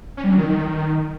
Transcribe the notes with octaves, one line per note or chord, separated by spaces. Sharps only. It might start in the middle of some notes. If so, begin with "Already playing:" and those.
C#4
G3
F#3
D#3